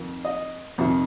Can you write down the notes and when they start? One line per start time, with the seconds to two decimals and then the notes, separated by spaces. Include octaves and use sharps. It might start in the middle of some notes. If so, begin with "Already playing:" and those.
Already playing: F2 D#3 A#3
0.25 D#5
0.78 F2 C3 D#3